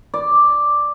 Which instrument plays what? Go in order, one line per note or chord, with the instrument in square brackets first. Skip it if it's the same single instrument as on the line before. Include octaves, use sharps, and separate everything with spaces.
[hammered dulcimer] D5